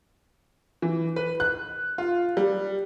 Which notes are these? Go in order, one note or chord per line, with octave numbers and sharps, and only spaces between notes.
E3
B4
F#6
F4
G3